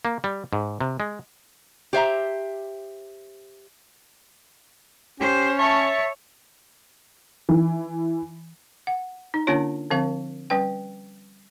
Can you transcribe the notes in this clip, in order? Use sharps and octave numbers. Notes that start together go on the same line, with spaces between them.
A#3
G3
G#2
C3
G#3
G4 C5 E5 A#5
C#4 G4 C5
C#5 E5 A5 C#6
E3
F#5
D#4
D3 A#3 C#4 D4 F4 C#5
D3 F3 C4 A#4 F5
G3 C#4 B4 G5